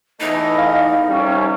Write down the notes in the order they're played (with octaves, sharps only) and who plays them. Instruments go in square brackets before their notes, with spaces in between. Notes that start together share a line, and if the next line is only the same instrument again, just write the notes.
[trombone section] E2 E3 A3 [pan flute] D#4 [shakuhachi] D#5
[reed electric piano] F5
[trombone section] C2 F2 G3 [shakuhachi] C#4